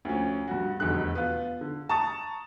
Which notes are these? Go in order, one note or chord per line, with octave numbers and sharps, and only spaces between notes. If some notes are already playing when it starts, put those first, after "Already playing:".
D2 F3 C#4
G2 F#4
F1 E2 B2 D3 F#6
B3 F4
D3
A5 A#5 C#6 D#6 A6